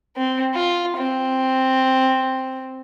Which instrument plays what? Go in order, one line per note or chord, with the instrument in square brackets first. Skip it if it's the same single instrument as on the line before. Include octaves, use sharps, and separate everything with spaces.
[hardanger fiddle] C4
F4
C4